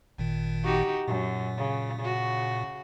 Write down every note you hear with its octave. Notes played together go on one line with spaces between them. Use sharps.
G#1 A#2 D#3
D#4 F#4 G4
F#2 A#2
C#3
C#3 F#4